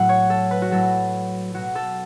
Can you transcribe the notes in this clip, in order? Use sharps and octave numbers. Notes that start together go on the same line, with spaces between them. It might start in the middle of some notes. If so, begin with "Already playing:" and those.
Already playing: A2 F#3 F#5
C#5
A4
B4
F#4
A2 F#3 A4
B2 F#3 F#4
A4